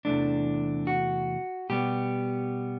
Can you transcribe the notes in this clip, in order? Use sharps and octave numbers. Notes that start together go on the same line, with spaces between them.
E2 C3 E3 A3 D4
F#4
B2 G3 B3 G4